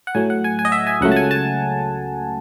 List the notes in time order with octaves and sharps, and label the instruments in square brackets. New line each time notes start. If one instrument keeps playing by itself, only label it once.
[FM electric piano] F#5
A2 F#3 A3 G#5
F#5
G#5
G#5
D#5
E5
G#5
C#2 C#3 F#3 A3 F#5
A5
G#5
A5